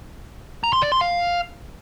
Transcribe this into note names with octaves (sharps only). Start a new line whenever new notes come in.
A#5
C6
D5
C6
F5